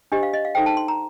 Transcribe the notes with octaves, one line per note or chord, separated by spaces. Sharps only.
D4 G4 C5 D#5
F5
D#5
F5
D#4 A4 C5 G5
A5
C6
A#5